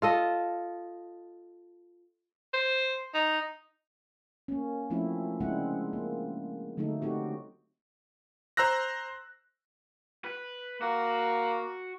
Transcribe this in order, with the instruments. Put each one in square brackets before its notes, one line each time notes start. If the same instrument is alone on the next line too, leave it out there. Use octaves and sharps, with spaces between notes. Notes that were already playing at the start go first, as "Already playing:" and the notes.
[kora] F4 A4 D#5
[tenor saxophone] C5
D#4
[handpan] A#3 C#4
F3 A3 C4 C#4 E4
C#3 G#3 C4 D4 E4 F#5
A#3
D3 F#3 A3 D#4 A4
A3 C4 D#4 F#4 G4
[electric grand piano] C5 A#5 E6 F#6 A#6
[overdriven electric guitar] B4
[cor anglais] A#3 [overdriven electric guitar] F#4